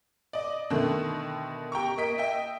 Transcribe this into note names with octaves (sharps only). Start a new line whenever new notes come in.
D5 D#5
B2 D3 D#3 A3
G4 G5 A#5 C#6
A#3 D#5 B6 D7
D#5 E5 G5